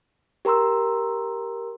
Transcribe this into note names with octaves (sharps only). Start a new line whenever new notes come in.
G4 A#4 A#5 C6 E6